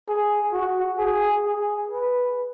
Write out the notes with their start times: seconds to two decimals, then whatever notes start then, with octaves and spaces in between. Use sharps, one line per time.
0.08 G#4
0.53 F#4
0.98 G#4
1.44 G#4
1.89 B4